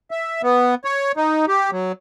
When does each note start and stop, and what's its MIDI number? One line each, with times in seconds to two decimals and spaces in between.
0.11 0.42 76
0.43 0.75 59
0.85 1.12 73
1.17 1.45 63
1.48 1.71 67
1.72 1.92 54